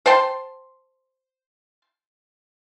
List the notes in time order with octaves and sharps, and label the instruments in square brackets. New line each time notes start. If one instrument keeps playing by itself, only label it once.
[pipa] C5 G5 A5 C6